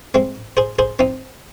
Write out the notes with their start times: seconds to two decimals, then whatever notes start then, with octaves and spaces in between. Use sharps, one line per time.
0.14 G#3 C4
0.57 G#4 C5
0.79 G#4 C5
0.99 C4 D#4